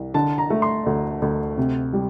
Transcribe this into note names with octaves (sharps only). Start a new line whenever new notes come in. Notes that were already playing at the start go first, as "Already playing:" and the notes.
Already playing: C2
D3 A5
A#5
A3
C6
D2
D2
C3
G3